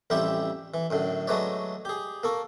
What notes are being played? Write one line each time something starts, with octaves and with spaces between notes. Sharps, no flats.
A1 F2 G3 E4 G4 E5
E3
F#2 A2 D3
F#3 G#3 A3 B4 C#5 D5
G4 G#4
A#3 A4 C#6